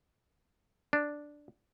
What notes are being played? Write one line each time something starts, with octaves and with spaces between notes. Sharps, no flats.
D4